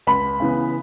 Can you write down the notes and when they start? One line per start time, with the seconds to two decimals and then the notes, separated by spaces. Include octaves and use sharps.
0.07 C#2 B5
0.40 C#3 E3 B3